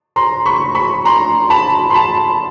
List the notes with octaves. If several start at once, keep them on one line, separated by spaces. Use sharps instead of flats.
A#5 C6
B5 C#6
B5 C#6
A#5 C6
A5 B5
C6
A5 B5